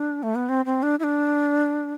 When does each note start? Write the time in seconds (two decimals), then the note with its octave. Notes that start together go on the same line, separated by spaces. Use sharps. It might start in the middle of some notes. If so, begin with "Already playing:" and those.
Already playing: D4
0.23 A3
0.35 B3
0.49 C4
0.66 C4
0.83 D4
1.00 E4
1.04 D4